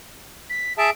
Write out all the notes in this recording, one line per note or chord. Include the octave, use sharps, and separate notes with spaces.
B6
G#4 E5 A5 D7